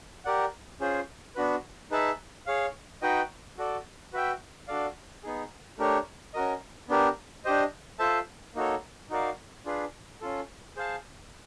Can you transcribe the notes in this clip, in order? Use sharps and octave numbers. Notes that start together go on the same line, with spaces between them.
G4 A#4 D5 F#5
C#4 F4 G#4 C5
B3 D4 F#4 B4
D#4 G#4 B4 E5 A5
G#4 C#5 F5
D#4 F#4 B4 D#5 G5
F#4 A4 D5
F#4 B4 E5 G5
D4 F#4 A4 D5 F5
B3 D#4 G#4
A3 D4 G4 A#4 C#5
C#4 F#4 A#4 D#5
B3 D4 G4 A#4
D4 G4 C5 D#5
F4 A4 C5 E5 A5
A#3 D#4 F#4 A4 C#5
D#4 F#4 A#4 D5 F5
D4 F4 G#4 B4
C#4 F4 A4
G#4 C5 F5 A5